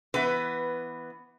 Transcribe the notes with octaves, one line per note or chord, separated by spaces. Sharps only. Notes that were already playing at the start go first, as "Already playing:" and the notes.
E3 B3 B4